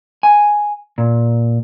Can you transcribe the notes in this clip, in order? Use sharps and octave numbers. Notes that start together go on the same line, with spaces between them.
G#5
A#2